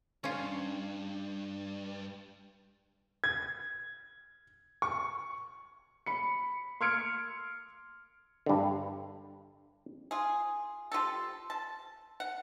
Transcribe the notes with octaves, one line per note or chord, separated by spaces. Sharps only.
D2 G2 C#4 F4
G#6
C#6
B5 C#7
C6 E6 F6 G#6 C#7 D7
G2 D3
F4 G#4
G3 F4 G4 A4
A5
F#5